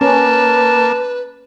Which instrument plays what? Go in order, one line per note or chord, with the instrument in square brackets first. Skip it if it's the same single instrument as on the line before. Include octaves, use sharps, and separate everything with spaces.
[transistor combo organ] A#3 [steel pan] C#4 [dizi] B4 [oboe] A5